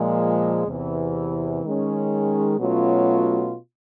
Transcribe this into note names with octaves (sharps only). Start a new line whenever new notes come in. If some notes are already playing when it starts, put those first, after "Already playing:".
Already playing: A#2 F3 G#3
E2 C3 E3
D#3 G#3 C#4
B2 F#3 A3 C#4 F4